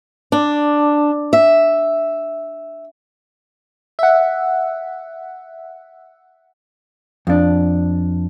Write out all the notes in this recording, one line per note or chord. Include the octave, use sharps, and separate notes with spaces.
D4
E5
E5 F#5
F2 D4